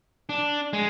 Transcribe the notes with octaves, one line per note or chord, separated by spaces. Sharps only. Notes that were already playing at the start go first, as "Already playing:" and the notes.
D4
G#3